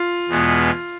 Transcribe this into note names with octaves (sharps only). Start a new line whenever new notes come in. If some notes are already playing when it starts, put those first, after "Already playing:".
Already playing: F4
E2 B2 G#3 B3